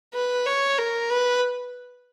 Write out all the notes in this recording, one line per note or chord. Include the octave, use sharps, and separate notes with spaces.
B4
C#5
A#4
B4